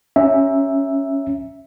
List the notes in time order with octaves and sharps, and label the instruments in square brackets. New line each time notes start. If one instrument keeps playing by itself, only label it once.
[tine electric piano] C#4 E5